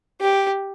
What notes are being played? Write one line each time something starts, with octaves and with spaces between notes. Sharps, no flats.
G4